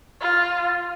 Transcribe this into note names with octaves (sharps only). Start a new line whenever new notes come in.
F4